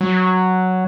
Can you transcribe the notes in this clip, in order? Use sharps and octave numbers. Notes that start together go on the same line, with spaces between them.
F#3